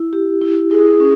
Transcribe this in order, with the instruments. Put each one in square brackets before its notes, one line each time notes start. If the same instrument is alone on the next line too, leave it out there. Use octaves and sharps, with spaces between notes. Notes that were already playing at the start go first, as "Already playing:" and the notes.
Already playing: [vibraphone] E4
G4
E4
[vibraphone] E4 [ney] G#4
[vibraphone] C#4